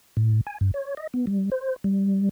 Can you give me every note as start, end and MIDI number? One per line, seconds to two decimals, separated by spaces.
0.17 0.41 45
0.47 0.58 80
0.61 0.71 43
0.74 0.94 73
0.97 1.07 75
1.14 1.25 59
1.27 1.50 55
1.52 1.76 72
1.84 2.29 55